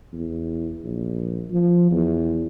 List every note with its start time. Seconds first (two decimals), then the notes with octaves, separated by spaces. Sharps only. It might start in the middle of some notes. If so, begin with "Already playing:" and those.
0.13 E2
0.84 A#1
1.51 F3
1.91 E2